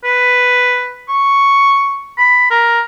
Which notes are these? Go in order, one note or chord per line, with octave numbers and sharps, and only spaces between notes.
B4
C#6
B5
A#4